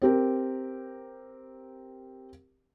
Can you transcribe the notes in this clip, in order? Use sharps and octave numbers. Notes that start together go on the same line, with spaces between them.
C4 G4 A#4